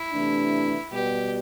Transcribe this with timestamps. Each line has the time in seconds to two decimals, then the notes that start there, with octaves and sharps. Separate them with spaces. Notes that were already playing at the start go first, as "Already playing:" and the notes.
Already playing: E4
0.12 C3 E3 A3 D4
0.92 B2 G3 B3 G4